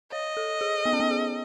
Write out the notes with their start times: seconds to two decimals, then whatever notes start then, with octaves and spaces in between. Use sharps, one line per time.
0.12 C#5 D#5
0.37 A4
0.61 G#4
0.86 B3
0.93 C#4
1.00 B3
1.11 G#4